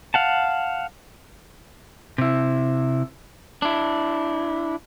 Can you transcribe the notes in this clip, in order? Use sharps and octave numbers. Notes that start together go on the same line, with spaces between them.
F5 F#5 A5
C3 E4
D4 E4